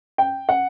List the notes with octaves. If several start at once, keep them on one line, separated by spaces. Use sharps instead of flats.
G5
F#5